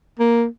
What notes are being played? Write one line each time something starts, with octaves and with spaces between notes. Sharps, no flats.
A#3